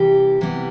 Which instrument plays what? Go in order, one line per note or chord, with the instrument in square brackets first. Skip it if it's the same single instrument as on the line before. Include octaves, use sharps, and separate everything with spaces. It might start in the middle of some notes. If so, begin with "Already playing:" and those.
Already playing: [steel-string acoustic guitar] C3 E3 G3 G4
C3 E3 G3 B3